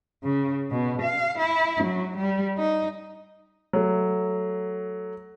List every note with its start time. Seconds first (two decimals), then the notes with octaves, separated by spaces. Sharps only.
0.23 C#3
0.71 B2
1.02 F5
1.39 E4
1.84 F#3
2.17 G3
2.57 D#4
3.73 F#3 A3